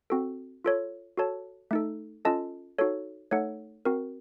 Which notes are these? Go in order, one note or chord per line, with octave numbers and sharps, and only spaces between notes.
C4 F#4 A4
F4 A4 C#5
F#4 A4 C#5 A5
A3 D#4 A4
C#4 F4 A4 D#5 A5
D#4 F#4 A4 C#5
A3 D#4 A4 C#5 F#5
C4 F#4 A#4